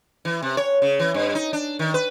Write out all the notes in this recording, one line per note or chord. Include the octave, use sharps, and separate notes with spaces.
E3
C3
C#5
C#3
E3
G2
D#4
D4
D#3
B4